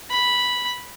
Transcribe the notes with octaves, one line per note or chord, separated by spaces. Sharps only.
B5